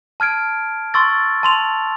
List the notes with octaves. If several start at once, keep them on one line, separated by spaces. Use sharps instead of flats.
A5 F6 G#6 D7
C6 C#6 E6 A6
A5 C6 F7